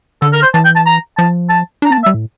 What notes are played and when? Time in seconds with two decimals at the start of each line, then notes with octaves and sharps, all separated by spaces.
0.22 D3 A4
0.33 A#4
0.43 C5
0.54 E3 A5
0.65 G5
0.76 A5
0.86 A#5
1.17 F3 A5
1.50 A5
1.82 D4
1.86 A#5
1.90 C4 A5
1.98 A#3
2.04 E5
2.06 G3
2.14 A2